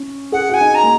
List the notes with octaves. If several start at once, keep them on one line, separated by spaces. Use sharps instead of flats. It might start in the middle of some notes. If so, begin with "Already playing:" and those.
Already playing: C#4
G#4 F#5
F#4 G#5
D#4
A#5
A#3